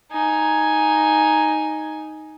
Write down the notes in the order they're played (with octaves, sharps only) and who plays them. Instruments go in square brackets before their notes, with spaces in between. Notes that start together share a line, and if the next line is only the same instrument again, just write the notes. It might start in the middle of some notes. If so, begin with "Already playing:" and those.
[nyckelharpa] D#4 G#5